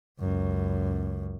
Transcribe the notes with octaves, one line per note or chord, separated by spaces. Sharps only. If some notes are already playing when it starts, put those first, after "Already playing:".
C#2 F#2